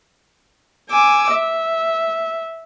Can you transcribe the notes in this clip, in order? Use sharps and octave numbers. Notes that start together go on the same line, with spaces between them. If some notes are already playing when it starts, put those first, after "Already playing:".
G#5 D6 E6
E5